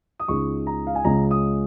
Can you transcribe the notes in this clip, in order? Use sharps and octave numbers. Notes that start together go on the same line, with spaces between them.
D#6
C#2 C#3 G#3 D#4 C#6
A#5
F5
G#5
C#2 C#3 G#3 C#4 A#5
D#6